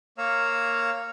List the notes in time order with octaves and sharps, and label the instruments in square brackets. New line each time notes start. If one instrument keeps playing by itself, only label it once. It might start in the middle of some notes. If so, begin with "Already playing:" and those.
[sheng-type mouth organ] A#3 C#5 F5 A#5 E6